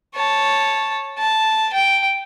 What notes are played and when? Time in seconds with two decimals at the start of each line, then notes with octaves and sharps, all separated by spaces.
0.15 C#5 A5
1.18 A5
1.73 G5